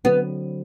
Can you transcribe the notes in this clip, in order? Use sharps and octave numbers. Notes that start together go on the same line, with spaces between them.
D3 F#3 B3 C4